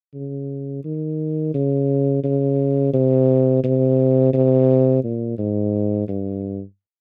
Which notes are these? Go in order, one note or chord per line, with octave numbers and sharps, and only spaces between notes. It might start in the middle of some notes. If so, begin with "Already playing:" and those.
C#3
D#3
C#3
C#3
C3
C3
C3
A#2
G#2
G2